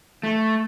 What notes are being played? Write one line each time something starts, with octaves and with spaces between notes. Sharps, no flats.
A3